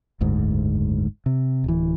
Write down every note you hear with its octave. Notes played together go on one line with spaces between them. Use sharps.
F#1 D2 G#2
C3
D1 E3